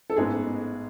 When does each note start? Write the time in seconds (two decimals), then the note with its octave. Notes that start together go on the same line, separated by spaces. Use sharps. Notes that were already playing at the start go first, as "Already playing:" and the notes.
0.10 A4
0.16 A1 G#2 G#3 B3 G#4